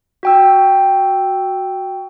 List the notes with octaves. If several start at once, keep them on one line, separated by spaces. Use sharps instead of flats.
F#4 G5 E6